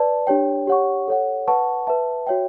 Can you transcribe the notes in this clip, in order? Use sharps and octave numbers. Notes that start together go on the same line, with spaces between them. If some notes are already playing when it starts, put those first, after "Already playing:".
Already playing: B4 D5 A5
D4 G4 C#5 G5
G4 C#5 F#5 C#6
A4 C#5 F#5
B4 F#5 A5 C#6
B4 E5 A5
F#4 C#5 E5 G5